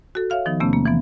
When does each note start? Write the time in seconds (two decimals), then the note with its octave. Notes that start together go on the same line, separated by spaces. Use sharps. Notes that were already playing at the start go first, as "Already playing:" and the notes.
0.15 F#4 A4
0.30 C#5 E5 F5 F6
0.46 D#3 F3 B3 D#4
0.60 E2 C3 A3 B3 C#4
0.73 A#3
0.86 E3 F3 B3